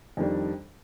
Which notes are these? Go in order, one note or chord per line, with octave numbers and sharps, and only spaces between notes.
F2 D#3 G3 D4